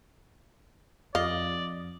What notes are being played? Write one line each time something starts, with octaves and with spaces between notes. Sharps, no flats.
F2 D5 D#5 F5